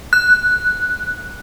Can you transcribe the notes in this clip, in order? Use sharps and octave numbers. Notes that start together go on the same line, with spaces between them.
F#6